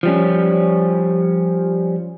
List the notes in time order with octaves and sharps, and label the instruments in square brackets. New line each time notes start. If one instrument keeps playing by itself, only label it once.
[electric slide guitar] F3 G3 C#4